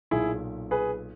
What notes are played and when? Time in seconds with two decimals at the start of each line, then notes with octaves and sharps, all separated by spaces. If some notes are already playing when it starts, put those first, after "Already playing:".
0.11 B1 A#2 E4 G#4
0.71 G#4 B4